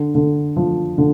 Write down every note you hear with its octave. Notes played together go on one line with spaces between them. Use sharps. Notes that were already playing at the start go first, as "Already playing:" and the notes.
Already playing: D3
D3
F3
D3